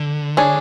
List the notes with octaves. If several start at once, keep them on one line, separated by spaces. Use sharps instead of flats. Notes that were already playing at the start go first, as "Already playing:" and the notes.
Already playing: D3
D4 G#4 C#5